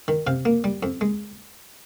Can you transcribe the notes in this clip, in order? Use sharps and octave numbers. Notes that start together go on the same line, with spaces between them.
D#3
C3 F5
A#3
G3
F2
G#3